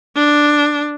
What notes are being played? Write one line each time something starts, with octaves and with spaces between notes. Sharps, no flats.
D4